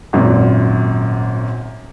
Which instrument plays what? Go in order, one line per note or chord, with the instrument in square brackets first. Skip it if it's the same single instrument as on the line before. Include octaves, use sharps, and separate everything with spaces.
[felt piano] G#1 F#2 A#2